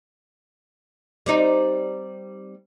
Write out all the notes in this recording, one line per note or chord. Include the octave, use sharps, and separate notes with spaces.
G3 C4 D#4